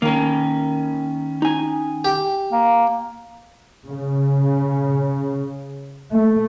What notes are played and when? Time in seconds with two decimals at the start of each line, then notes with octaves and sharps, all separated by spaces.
0.02 D#3 A#3 C#4 A#4
1.42 D#4 G#5
2.05 G4
2.52 A#3
3.88 C#3
6.11 A3